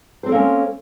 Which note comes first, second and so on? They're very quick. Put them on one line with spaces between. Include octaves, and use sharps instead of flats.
C5 C4 A4 A#3 C#4